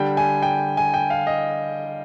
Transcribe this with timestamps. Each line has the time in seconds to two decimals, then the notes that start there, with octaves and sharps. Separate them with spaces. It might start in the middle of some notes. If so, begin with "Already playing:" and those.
Already playing: D3 G3 G5
0.17 G#5
0.42 G5
0.77 G#5
0.94 G5
1.10 F5
1.27 D#5